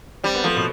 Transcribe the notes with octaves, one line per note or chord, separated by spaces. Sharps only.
G3 C4
B3
F3 A3
B2 B3